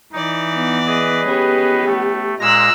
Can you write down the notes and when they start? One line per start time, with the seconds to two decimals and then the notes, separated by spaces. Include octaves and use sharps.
0.12 E3 D#4 D5
0.53 B3
0.86 G#4 B4 D#5
1.28 B3 C#4 G4
1.85 A3
2.40 A#2 G#3 A#5 E6 F#6 A#6